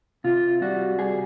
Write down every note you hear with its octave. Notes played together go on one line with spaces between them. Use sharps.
C3 F4
G3 F#4
G3 G#4